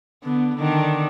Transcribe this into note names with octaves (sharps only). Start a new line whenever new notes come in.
D3 B3
D3 D#3 D4